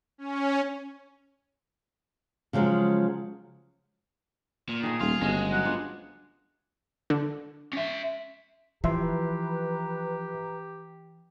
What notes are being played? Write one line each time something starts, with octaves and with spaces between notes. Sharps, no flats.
C#4
C#3 F3 F#3 G#3
A#2
D#3 A3 G#4
D#1 F4
G1 C#3 G#3 C#4 F#4
F#3 B3 F#5
D4 F4 C5
D3
C#4 E5
E3 F3 G4 B4 E5 A#5 C6